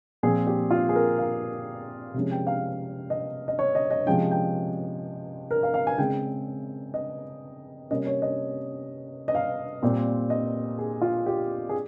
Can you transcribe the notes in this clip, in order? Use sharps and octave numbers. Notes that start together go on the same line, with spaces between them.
A#2 F3 C4 G#4
G4
F4
G#4
A#4
F5
C3 F3 G#3 C#4
G5
F5
D#5
D#5
C#5
D#5
D#5
C3 F3 G#3 C#4 G5
G5
A#4
F5
F5
G#5
C#3 G#3 C4 G5
D#5
C3 G3 A#3 C#4 D#5
C#5
D#5
D#5
F5
A#2 G3 C4
D#5
G#4
F4
G4
G#4